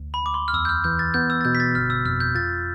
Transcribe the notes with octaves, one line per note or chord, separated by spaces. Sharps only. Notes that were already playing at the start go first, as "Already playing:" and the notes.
Already playing: D2
B5
D2 D6
C6
F6
E2 E6
G6
F6
E3 G6
A6
B3 G6
E6
A6
B2 G6
B6
A6
G1 F6
E6
F2 F6
G6
F4 A6